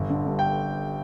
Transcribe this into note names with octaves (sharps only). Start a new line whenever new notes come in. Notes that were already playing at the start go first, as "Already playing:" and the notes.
Already playing: G1
D3
G2
G5